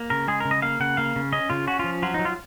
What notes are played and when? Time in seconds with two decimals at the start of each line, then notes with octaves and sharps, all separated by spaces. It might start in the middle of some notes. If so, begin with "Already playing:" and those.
Already playing: A#3
0.10 C#3 A#4
0.28 G#3 G#4
0.40 C#3 A#4
0.51 D#5
0.62 A#3 F5
0.80 C#3 F#5
0.97 A#3 F5
1.16 C#3
1.33 C#4 D#5
1.50 C#3 F4
1.67 C#4 F#4
1.79 F3 F4
2.02 F#3 F4
2.14 F#3 D#4
2.25 F4